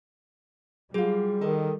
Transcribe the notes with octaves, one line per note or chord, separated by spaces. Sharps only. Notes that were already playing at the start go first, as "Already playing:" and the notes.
F#3 G3 F4 F#4 G#4
D#3 A4 A#4 D#5